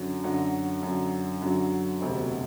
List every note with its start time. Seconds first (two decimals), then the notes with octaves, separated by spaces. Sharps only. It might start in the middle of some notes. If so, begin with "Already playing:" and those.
Already playing: F#2 D3 F#3
0.24 F#2 D3 F#3
0.83 F#2 D3 F#3
1.42 F#2 D3 F#3
2.01 E1 D2 C3